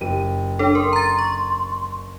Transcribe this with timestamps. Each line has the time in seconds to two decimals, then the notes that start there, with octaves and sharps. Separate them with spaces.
0.01 F#1 G4 D#7
0.59 D4 A4 C#5
0.75 A#4 C6
0.93 A#5 A6
1.18 C#6